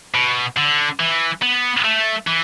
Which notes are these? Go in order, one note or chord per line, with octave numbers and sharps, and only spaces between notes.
B2
D3
E3
B3
A3
E3